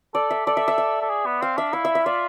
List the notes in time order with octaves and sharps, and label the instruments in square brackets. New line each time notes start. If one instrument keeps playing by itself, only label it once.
[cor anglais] A4 [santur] D5
[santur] E5
[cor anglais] A4 [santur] D5
[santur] E5
E5
E5
[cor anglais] A4
G#4
B3
[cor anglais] C4 [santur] F5
[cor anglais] D4 [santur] E5
[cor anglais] E4 [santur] F5
[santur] E5
E5
[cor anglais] F4 [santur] D5